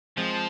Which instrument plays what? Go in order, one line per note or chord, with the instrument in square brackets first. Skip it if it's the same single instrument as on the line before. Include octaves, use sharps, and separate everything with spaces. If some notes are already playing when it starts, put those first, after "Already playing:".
[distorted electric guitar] F3 [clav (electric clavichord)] G#3 C4